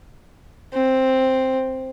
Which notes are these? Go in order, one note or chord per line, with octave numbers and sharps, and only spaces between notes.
C4